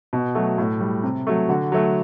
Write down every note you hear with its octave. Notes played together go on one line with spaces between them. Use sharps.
B2
F#3 A3
A2
G3
C3
F#3 A3
D3 F#4
F#3 A3